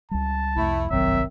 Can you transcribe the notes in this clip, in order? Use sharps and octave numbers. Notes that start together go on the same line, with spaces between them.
C#2 G3 A5
C2 F2 A3 E4
G1 C2 F#2 D#3 F#3 C4 E5